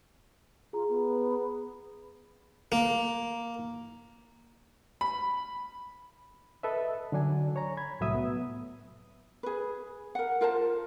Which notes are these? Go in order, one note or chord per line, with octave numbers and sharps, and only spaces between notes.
F4 G#4 A#5
B3
A#3
B5
A4 B4 D#5 E5
D3 F#3 D4 G#5
C#5 A#5
B5 G#6
C2 A2 F#3 A3 E5 D#6
B3
G#4 B4
A#4 F#5
F4 A#4 C5 A5